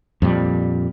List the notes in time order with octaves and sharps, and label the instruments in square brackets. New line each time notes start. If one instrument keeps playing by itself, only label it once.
[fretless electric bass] F2 A#2 G3